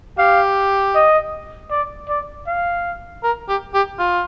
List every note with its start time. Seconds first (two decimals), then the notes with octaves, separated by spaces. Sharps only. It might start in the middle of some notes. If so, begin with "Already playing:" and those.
0.18 G4 F5
0.95 D#5
1.71 D5
2.09 D5
2.47 F5
3.23 A#4
3.49 G4
3.74 G4
3.99 F4